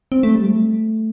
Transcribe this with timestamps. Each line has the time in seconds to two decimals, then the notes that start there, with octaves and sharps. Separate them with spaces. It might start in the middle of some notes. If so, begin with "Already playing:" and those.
0.12 C4
0.23 A3
0.35 G3
0.47 A3